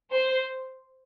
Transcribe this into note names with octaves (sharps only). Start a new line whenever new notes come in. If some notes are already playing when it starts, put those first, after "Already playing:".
C5